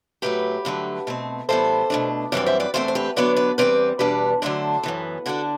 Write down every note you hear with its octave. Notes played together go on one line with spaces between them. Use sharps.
A2 F#3 A3 G4 B4
G2 D3 F#3 A3
B2 A3 C4
A2 E3 G3 B3 A4 C5
B2 A3 D4
F#2 E3 G3 C4 B4 D5
C5 E5
B4 D5
E2 D3 A3 C4 A4 C5
C5
G4 B4
D3 F#3 B3 D4 B4 D5
B4 D5
E2 B2 G3 C4 B4 D5
E2 B2 G3 D4 B4 D5
D3 F#3 A3 D4 A4 C5
F#2 E3 B3
D3 G3 D4 F#4 A4